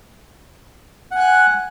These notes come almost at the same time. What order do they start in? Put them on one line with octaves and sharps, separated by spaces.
F#5 G#5 F#6